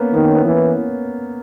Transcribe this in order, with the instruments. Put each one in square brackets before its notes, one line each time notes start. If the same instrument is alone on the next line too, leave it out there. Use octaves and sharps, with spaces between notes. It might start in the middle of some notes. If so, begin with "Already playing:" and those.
Already playing: [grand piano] A#3 B3 C#4
[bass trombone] D#3 [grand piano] B3
[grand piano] C#4
B3
[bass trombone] E3